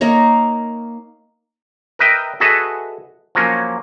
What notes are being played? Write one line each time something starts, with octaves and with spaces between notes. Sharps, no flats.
A#3 D#4 A#4 C#5
A#4 B4 D#5 E5 G5
F#4 G#4 A4 B4 D#5 E5
F3 F#3 A#3 C#4